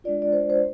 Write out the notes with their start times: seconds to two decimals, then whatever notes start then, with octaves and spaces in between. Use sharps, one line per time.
0.04 G#3 D4 F4 D5
0.22 D5
0.32 C5
0.50 C5